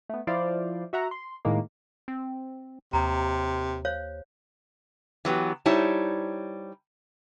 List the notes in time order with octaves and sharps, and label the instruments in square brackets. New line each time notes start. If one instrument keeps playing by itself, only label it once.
[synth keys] A3 B3
F3 E4 C5 D5 F5
F#4 E5 F#5 A#5
C6
A2 D#3 G#3 A#3
[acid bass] C4
[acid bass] D#2 [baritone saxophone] C3 [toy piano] A#5
[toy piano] C5 C#5 F5
[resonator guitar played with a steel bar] E3 F#3 B3 G4
G3 D#4 E4 C5 C#5 A5